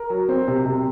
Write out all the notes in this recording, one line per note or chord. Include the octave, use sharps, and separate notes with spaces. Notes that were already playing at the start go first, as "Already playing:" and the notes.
Already playing: A#4
F#3
C4
C3
C3